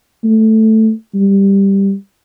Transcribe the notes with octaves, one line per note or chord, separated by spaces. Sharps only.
A3
G3